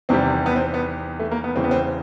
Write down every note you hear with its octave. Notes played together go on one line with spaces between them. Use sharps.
E2 C3 D#3 G3 C4
B3
C4
B3
A3
A#3
B3
E2 C#3 E3 G3 C4
B3
C4